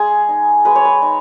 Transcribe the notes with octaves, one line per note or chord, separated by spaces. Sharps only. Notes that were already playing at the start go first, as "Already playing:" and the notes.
Already playing: G#3 G#4
D#4
G#3 B4
C#5
B4
D#4